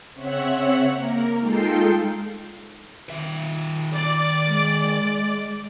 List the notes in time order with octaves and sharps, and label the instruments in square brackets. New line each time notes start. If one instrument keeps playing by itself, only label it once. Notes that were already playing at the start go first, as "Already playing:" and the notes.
[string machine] C#3 C4 C#5 E5 F#5 F#6
A#3 A#4
G#3 D#4 F4 A4 G5 C7
[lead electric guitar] D#3 E5
[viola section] D5
[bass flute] G#3